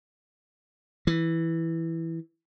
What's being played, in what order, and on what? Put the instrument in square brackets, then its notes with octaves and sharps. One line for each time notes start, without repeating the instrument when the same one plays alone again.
[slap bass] E3